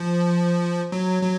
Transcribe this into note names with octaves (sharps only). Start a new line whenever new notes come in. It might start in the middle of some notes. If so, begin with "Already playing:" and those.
Already playing: F3
F#3
F#3